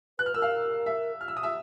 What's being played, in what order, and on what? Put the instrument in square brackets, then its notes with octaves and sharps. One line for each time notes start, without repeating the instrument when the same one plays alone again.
[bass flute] B4 [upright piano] F#6
[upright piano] F6
[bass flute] A#4 [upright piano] E6
[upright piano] F5 F6
E5 E6
F6
E6
D#6
E5 E6